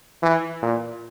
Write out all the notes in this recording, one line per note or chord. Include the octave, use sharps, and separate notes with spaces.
E3
A#2